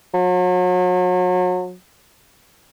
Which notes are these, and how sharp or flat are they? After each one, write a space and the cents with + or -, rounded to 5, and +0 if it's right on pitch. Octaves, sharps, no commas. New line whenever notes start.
F#3 -35